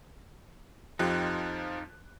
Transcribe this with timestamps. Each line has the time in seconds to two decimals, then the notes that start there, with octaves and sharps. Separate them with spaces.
0.99 F2 F3 D#4 F4 G4 F#6